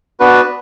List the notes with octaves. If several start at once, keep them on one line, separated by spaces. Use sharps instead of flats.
B3 D4 F#4 B4